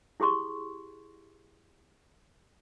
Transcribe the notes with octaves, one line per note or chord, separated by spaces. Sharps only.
E4 G4 G#4 C6 C#6